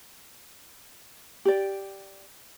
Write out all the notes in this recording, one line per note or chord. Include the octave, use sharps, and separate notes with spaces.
G4 D5